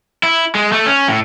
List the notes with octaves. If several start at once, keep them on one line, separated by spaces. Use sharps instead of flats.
E4
G#3
A3
C#4
A2